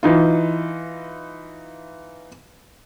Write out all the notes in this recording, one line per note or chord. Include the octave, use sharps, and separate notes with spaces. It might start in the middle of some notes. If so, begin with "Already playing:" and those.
E3 D#4 F4